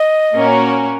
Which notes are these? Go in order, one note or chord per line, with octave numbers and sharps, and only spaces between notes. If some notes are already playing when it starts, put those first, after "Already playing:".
Already playing: D#5
A#2 A#3 C#4 F#4 A#4